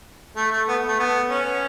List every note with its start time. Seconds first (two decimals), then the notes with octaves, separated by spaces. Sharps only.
0.36 A3
0.51 A3
0.68 B3
0.88 A3
0.99 B3
1.29 C#4